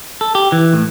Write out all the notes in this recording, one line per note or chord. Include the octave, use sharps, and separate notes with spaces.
A4
G4
E3
A2